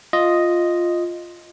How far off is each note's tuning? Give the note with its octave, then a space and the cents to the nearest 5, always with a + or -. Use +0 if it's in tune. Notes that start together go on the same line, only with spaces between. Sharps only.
F4 +0 D#5 +0